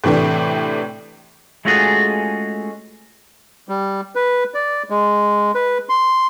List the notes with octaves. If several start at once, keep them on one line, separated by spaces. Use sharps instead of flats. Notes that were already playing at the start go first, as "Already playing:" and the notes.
A2 C3 E3 A3 D4
G#3 A3 C#4 F4 F#4 G#4
G3
B4
D5
G#3
B4
C6